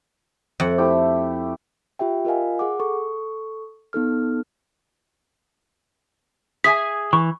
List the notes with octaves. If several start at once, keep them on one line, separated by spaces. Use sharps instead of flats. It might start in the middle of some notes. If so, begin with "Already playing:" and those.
F2 E5 F#5
A3 E4 G4
F4 G4 E5 G5
F4 A#4 D#5 F5 G#5
G#4 F#5 D6
A4 C#6
B3 D#4 A4 F6
G#4 E5 G#5 B6
E3 C#6